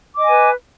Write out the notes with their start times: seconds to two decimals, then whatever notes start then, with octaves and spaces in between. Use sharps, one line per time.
0.14 D6
0.19 D#5
0.23 G#5
0.27 B4